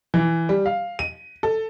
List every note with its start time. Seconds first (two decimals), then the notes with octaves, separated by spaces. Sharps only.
0.14 E3
0.49 G3
0.66 F5
0.99 D#7
1.43 A4